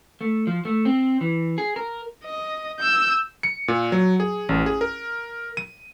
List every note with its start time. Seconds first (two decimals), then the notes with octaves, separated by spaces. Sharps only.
0.21 A3
0.47 F3
0.65 A3
0.85 C4
1.21 E3
1.58 G#4
1.76 A#4
2.24 D#5
2.80 E6 G6
3.43 C#7
3.68 A#2
3.92 F#3
4.20 G#4
4.49 A1
4.66 G#4
4.81 A#4
5.57 D#7